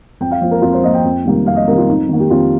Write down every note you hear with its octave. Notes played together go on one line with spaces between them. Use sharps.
F2 G5
F5
F3 A#3 C5
A#4
F2 F4
C5
F3 A#3 D#5
G5
F2
C3 D#3 G3 A#3
F2 F5
D#5
C3 D#3 G3 A#3 A#4
F4
F2 D#4
D#3 A#3
G4
F2 F4